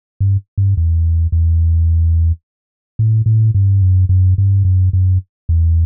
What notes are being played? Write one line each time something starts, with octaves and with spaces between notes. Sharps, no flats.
G2
G2
E2
E2
A2
A2
G2
F#2
F#2
G2
F#2
F#2
E2